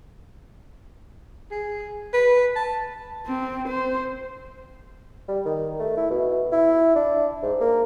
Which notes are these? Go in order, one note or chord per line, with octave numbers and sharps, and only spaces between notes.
G#4
B4
A5
C4
C5
G3
D#3
A3
E4
B2
E4
D4
G#2
A#3